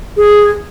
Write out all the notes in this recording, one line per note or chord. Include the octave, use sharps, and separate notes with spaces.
G#4